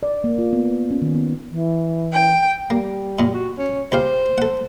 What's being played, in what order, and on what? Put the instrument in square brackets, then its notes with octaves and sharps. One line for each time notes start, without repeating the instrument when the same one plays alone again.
[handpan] D5
A#3
F4
B3
C#4
D#3
B3
[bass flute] E3
[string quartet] G5
[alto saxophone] G3 [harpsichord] A#3
[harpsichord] F#2 A#2
[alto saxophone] F#4
C#4
[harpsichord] C#2 G4 F5 [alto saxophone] C5
[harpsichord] A4 F#5